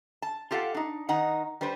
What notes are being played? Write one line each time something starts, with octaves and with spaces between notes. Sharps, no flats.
A5
F4 G4 A4 F5 F#5
D4 D#4
D#3 D#4 F#5 A#5
G3 D4 B4 C5